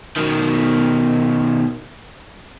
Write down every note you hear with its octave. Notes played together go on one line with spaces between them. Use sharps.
B2 D#3